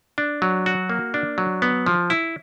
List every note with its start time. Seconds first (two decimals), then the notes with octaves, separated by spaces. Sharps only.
0.18 D4
0.42 F#3
0.66 F#4
0.89 A#3
1.14 D4
1.38 F#3
1.62 B3
1.86 F3
2.10 E4